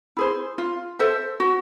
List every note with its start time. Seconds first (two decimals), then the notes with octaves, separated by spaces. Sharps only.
0.17 E4 G#4 C5
0.58 F4
0.99 A4 C5 E5
1.40 F#4